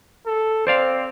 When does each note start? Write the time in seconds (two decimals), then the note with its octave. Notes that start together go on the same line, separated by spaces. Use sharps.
0.27 A4
0.67 C4 C5 D5 F5